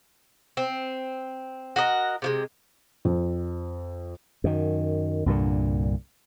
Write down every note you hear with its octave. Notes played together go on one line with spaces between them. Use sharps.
C4
F#4 A#4 D#5
C3 F3 G#3
F2
F#2 D#3
C2 G2 A#2 D3